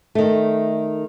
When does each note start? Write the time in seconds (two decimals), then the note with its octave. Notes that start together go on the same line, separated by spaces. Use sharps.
0.15 D#3 A3